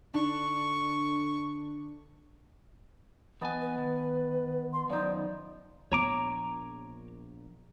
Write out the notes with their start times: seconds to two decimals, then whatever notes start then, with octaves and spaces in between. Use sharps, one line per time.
0.14 D3 D4 C#6
3.41 E2 B3 D#5 G#5 A5
3.61 B4
3.78 D#3
4.73 C6
4.90 F#2 D#3 F3 D#4 D5
5.92 A#1 B3 C#5 A#5 D6